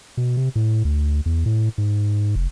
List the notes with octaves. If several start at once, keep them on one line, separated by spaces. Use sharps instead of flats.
B2
C3
A2
D2
E2
A2
G#2
F1